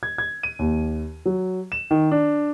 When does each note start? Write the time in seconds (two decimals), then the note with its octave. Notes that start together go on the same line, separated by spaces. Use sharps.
0.03 G#6
0.18 G#6
0.43 D#7
0.59 D#2
1.26 F#3
1.72 E7
1.91 D#3
2.11 D4